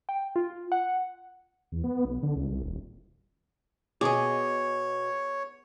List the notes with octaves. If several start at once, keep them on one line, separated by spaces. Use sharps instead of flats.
G5
F4
F#5
E2
B3
B1
D3
C#2
C2
D#1
B2 G#4 C#5 D#5 G#5 D6